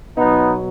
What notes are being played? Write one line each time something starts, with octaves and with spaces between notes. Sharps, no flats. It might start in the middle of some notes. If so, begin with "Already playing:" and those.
B2 F#3 B3 D#4